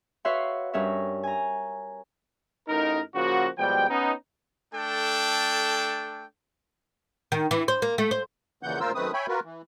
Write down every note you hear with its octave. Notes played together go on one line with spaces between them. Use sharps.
F#4 B4 C#5 E5 F5 C6
G2 C#4 A#4 C#5 E5
G#5 A#5
A1 D#4 A#4
C#3 F3 A#3 F#4
B2 F3 G3 G#3 G5
B3 C#4 D#4
A3 D4 A4 G5
D#3
E3
C5
A#3
A3
C5
D#2 A#2 C#3 E3 F#5 G6
D2 A#2 F4 A#4 C5 E6
F#2 D#3 A3 C4 B4 D#6
C#5 E5 G5 G#5 B5
F4 F#4 A#4 B4
E3